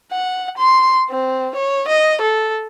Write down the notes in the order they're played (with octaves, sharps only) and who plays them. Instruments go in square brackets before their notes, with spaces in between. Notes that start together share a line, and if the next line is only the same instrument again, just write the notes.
[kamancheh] F#5
C6
C4
C#5
D#5
A4